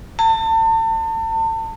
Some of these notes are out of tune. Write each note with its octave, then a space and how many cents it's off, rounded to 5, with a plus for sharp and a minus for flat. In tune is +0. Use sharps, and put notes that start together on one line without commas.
A5 +35